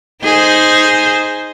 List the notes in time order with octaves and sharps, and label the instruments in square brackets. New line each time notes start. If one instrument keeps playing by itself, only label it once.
[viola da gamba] D#4 G#4 C5